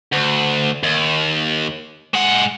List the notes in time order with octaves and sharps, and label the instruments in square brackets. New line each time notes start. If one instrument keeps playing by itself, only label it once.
[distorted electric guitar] D2
D#2
G#3 F#5